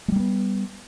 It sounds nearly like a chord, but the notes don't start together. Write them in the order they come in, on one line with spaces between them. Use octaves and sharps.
G#3 G3 A#3 B3